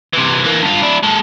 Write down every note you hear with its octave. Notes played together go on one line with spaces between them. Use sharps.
C3 E3
E3 A#3
G2 F4
D4 E4
G#3 A4